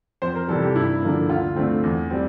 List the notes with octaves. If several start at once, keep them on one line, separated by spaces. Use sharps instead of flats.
F2 C5
A#4
C3 E3 G3 A4
G4
G2 E4
D3 F3 A#3
D2 F4
D3 A3 C4
E2
G3 C4